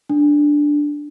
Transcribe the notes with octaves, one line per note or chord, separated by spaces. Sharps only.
D4